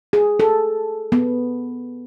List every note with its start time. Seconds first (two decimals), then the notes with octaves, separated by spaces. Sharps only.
0.13 G#4
0.40 A4
1.12 B3